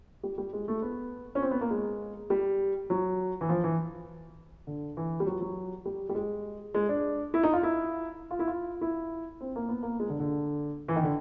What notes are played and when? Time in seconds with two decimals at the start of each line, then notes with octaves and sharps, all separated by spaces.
0.23 G3
0.38 G3
0.53 G#3
0.68 A3
0.82 B3
1.35 C#4
1.42 C4
1.51 B3
1.61 A#3
1.71 G#3
2.30 G3
2.90 F#3
3.41 E3
3.49 F3
3.64 E3
4.67 D3
4.97 E3
5.20 G3
5.26 F#3
5.41 F#3
5.85 G3
6.09 G3
6.15 G#3
6.74 G#3
6.89 D4
7.34 E4
7.43 D#4
7.53 F4
7.63 E4
8.31 F4
8.39 E4
8.47 F4
8.81 E4
9.41 C4
9.56 A#3
9.69 B3
9.83 A#3
10.00 G#3
10.10 D3
10.20 D3
10.88 E3
10.96 D#3
11.03 D3